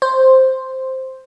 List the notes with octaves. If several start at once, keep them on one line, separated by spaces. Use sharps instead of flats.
C5